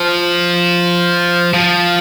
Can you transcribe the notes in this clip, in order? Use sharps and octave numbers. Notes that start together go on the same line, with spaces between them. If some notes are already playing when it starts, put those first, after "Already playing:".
Already playing: F3
F3